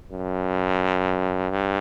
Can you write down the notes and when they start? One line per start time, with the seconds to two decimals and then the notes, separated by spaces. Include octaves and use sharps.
0.12 F#2
1.50 G2